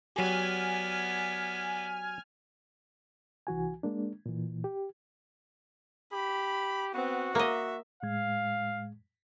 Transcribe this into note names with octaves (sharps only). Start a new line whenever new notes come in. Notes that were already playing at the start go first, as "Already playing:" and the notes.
F#3 B3 G4 D5 G#5 F6
C2 E3 F#4 G#5
G#3 A#3 D4
A#2 E3
G4
G4 B5
B3 C4 F#4
A#3 D#5 E5
A2 G#3 F5 G#6